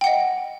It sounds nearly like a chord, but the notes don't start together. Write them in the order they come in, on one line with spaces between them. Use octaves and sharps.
G5 F#5 D#5